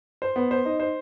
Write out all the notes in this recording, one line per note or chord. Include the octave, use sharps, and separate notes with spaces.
C5
B3
C5
D#4
C5